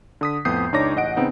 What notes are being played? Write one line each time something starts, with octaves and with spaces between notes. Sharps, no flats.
D3 D#6 B6
F2 A2 B3 D#6 G6 C7
C#2 D4 D#4 C#5 D6 A#6
A1 D#5 F#5 D7
C#3 B3 C4 D#4